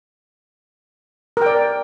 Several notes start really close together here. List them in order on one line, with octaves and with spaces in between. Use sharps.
A#4 G5 D5